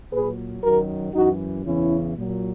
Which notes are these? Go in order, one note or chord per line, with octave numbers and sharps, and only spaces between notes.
A#2 F#3 G#4 B4
F#2 D#3 F#3 F#4 A#4
F#2 E3 D#4 F#4
E2 C#3 E3 C#4 E4
A#2 F#3